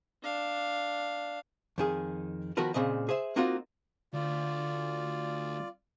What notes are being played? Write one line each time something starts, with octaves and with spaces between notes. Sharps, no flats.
D4 F5
F2 D#3 G#4
D#3 F3 B3 F#4 A#4 B4
A#2 C#3 C4 D#5
G#4 C5 E5
A#3 C4 D#4 F4 F#4 A#4
D2 F4 D5